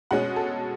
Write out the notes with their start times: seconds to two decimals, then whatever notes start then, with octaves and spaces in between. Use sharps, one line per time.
0.11 B2 G#3 C#4 F#5
0.36 A4